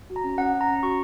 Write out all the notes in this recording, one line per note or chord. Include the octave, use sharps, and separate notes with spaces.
F#4
A#5
C#4
C#4 F#5
C#4
A#5
C#4
F#4 C#6